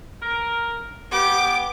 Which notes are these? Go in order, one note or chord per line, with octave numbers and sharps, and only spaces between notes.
A#4
B3 G4 D6